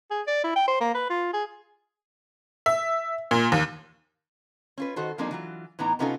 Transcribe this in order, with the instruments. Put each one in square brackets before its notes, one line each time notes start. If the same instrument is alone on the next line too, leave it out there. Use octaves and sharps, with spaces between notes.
[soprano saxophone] G#4
D5
E4
G5
C5
A#3
B4
F4
G#4
[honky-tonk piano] E5
A#2
D#2
[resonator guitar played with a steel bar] C#4 F4 B4
D#3 F#4 A4 C5
F3 G#3 A#3 C4 D4 D#4
E3 F#3 F4
A2 E3 B3 D#4 A#5
C3 B3 C#4 D#4 F4 A4